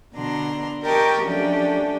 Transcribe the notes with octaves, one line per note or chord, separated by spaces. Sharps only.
B2 D3 D4 A#5 C6
G4 A#4 D#5 G5 A5 C#6
F3 F#3 A3 C#4 D4 G4